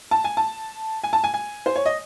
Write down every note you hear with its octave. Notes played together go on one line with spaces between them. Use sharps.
A5
G#5
A5
G#5
A5
G#5
G#5
C5
C#5
D#5